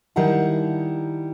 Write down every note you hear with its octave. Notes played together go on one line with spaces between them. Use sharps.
D#3 G3 E4 F#5 A5